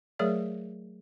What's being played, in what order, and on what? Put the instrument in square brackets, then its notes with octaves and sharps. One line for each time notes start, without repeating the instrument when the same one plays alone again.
[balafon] F#3 A3 G#4 A#4 C#5 E5